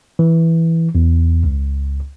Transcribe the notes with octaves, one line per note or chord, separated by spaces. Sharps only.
E3
E2
C#2